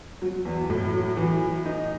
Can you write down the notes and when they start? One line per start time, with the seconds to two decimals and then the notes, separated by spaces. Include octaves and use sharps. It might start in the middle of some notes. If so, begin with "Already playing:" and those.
0.22 F#3
0.45 E2
0.70 A2
0.94 F#3
1.17 E3
1.41 E3
1.66 D#4